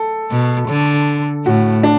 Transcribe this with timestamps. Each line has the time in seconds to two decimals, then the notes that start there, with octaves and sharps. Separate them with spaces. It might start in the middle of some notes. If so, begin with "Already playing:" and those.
Already playing: A4
0.31 B2
0.69 D3
1.46 A2 F#4
1.83 D4